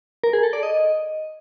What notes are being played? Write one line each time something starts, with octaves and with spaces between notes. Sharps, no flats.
A#4
G#4
A4
D5
D#5